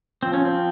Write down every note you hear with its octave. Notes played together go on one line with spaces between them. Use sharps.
F3 C4
C#4
C4